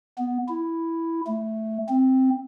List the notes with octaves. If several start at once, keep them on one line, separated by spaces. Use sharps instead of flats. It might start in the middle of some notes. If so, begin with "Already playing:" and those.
B3
E4
A3
C4